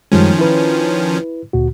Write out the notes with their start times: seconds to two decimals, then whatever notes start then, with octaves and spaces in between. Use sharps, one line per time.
0.12 F#2 D#3 F3 G3 G#3 C#4
0.38 E4 B4
1.53 D2 A#2 F#4